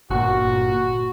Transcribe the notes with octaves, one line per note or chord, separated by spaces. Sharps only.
G1 A#2 F#4